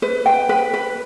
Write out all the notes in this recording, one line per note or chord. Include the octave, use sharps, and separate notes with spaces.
B4
G5
B4
B4